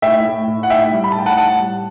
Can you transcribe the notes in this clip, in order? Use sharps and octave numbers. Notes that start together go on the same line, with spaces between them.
A2 E5 G5
A2
A2
F#5
A2 E5 G5
G3
B5
A5
A2 G5
F#5 A5
A2 F#5 A5
G3